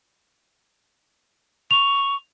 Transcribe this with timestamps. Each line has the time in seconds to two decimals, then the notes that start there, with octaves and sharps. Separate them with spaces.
1.71 C#6 F7